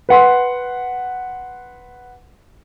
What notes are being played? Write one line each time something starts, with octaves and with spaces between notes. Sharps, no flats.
B4 F#5 C6